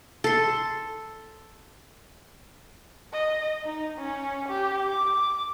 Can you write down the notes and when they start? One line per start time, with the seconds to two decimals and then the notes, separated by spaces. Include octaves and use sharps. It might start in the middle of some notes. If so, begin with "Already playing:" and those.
0.24 A4 C6
3.13 D#5
3.64 D#4
3.98 C#4
4.48 G4
4.90 D6